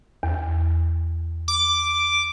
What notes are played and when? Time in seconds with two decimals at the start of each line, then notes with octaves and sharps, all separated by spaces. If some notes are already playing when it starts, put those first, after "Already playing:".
0.23 E2
1.48 D6